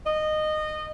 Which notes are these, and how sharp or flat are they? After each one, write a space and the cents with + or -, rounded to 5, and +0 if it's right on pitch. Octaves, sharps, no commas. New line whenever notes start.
D#5 -20